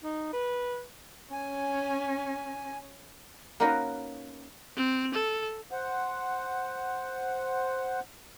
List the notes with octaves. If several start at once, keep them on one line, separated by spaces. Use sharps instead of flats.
D#4
B4
C#4 G#5
A#3 C#4 D#4 F#4 A#4 B4
C4
A4
C5 F#5